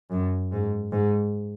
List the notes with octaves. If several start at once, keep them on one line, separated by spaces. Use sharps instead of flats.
F#2
G#2
G#2